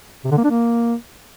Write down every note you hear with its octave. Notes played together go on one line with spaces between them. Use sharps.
C3
D3
A#3
D4
A#3